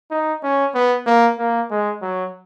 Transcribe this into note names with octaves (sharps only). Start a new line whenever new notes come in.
D#4
C#4
B3
A#3
A#3
G#3
F#3